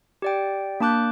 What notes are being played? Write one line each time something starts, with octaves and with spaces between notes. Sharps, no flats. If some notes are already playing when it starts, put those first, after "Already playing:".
G4 D5 G5
A#3 D4 A5 D6 F#6 G6